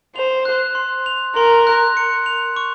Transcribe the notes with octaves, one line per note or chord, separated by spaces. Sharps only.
C5 F7
F#6
C6
F7
A#4 C6
F#6
C#7
F7
C#6